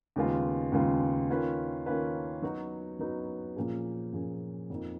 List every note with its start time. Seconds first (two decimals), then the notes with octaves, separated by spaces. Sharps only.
0.16 D#2 C#3 G#3 B3 F4
0.72 D#2 C#3 G#3 B3 F4
1.29 D#3 A#3 C#4 F4 B4
1.86 D#3 A#3 C#4 F4 B4
2.42 F#3 B3 D#4 F#4
2.99 F#3 B3 D#4 F#4
3.56 A#2 F3 A#3 C#4 G#4
4.13 A#2 F3 A#3 C#4 G#4
4.70 F2 F3 A#3 D#4